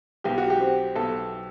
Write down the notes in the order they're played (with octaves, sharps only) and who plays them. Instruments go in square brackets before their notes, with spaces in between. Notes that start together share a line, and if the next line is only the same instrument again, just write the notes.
[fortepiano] B1 G4
F#4
G4
C4
B1 A4